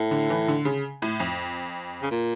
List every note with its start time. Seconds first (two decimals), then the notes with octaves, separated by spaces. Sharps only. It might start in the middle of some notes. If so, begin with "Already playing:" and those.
Already playing: A2
0.11 D3
0.30 E3
0.48 D3
0.65 C#3
1.02 A2
1.20 F2
2.02 C#3
2.11 A#2